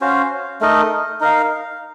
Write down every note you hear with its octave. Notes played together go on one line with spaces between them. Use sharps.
C#4 F#4 C5 F5
A3 D#4 A#4 D#5
D#4 A#4 F5